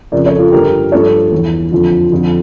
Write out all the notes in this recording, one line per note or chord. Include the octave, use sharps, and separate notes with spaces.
F2 C#3 F3 A#4 D5
A4 C#5
F4 A4
G2 D3 F3 G4 A#4
G2 F3 A4 C#5
E2 E3
F2 D3 F3
F2 D3 F3